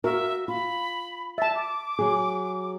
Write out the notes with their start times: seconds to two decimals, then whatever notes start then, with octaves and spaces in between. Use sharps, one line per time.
0.04 F#4 A#4 E5
0.48 F4 B5
1.38 E5 A5 A6
1.55 D6
1.99 F#3 G#4